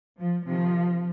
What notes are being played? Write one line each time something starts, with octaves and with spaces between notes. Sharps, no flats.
F3
C3 D#3 F3